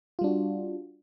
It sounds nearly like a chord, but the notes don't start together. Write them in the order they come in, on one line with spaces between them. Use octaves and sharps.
F4 G3 D4 F#4